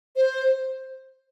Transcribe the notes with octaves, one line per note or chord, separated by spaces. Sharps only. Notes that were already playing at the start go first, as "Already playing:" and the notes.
C5